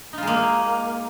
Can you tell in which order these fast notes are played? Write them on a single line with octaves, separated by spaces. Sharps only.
D#4 F4 G#3 A#3